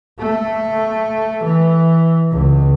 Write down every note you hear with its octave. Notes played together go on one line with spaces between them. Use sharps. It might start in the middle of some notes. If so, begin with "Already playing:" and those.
A3
E3
C#2